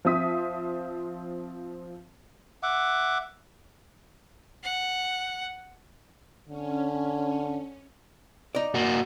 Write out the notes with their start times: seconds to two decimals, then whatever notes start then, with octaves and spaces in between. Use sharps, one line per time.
0.05 F3 C4 E5 D#6 B6
2.63 E5 F#5 D6
4.63 F#5
6.49 D3 C#4
8.55 D#4 D5
8.75 A#3 F#4